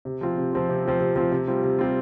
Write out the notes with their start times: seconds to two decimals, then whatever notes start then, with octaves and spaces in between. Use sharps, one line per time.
0.05 C3
0.21 F3 C4 F4
0.38 C3
0.53 F3 C4 F4
0.69 C3
0.85 F3 C4 F4
1.01 C3
1.16 F3 C4 F4
1.32 C3
1.47 G3 C4 F4
1.63 C3
1.79 G3 C4 F4